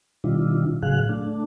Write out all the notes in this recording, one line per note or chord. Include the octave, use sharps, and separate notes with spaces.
B2 D#3 G3 D4 E4 F4
A2 C#3 F#3 G#4 F5 F#6
A3 D4